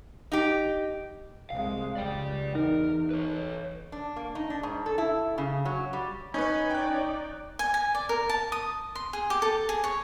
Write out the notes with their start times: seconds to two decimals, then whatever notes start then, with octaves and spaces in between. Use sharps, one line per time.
0.32 D#4 G4
1.50 C2 G#3 F5
1.96 C#2 D5 G5
2.55 E2 D#4 A#4
3.11 B4 C#5
3.92 D4
4.16 A#3
4.35 D#4
4.50 D4
4.63 G#2
4.86 A4
4.98 E4
5.38 C#3
5.65 F#3
5.93 G3
6.34 C#4 D#4 B4
6.70 D#4 D5 G5 F#6
7.59 G#5
7.74 G#5
7.95 D5
8.09 A#4
8.29 A5
8.52 D#6
8.95 C6
9.13 G#4
9.30 G4
9.42 A4
9.69 G#4
9.84 C#5